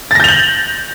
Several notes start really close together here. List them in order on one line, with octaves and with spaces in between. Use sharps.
A6 A#6 G6 F7 F#7